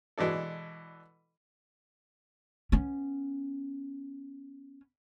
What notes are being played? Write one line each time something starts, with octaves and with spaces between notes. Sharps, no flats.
B2 E3 G#3 D4 A4
B3 C#4